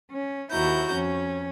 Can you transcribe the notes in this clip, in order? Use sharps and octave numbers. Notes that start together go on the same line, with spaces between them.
C#4
D#2 E4 F#4 A#5 G6
F2 C#4